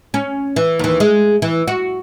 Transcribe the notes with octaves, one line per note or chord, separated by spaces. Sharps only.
C#4
E3
D#2 E3
G#3
E3
F#4